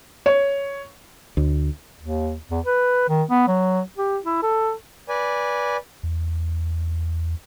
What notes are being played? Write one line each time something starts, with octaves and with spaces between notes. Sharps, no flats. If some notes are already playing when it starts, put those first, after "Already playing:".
C#5
D2
D#2
E2
B4
D#3
B3
F#3
G4
E4
A4
B4 D5 G#5
E2